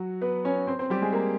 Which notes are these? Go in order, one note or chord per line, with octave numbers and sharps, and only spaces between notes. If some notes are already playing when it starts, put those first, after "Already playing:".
Already playing: F#3 F#4
B3 B4
C#4 C#5
C4 C5
C4 C5
G3 G4
G#3 G#4
A#3 A#4